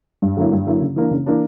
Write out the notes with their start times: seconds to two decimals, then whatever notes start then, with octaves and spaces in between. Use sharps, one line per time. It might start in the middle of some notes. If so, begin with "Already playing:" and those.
0.22 G2
0.37 D3 F#3 A#3 E4
0.52 G2
0.67 D3 F#3 A#3 E4
0.82 C#3
0.96 E3 A#3 D4
1.11 C#3
1.26 E3 A#3 D4